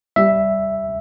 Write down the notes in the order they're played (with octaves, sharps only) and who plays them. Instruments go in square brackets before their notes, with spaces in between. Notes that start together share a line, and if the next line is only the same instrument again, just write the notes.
[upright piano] G3 [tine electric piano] E5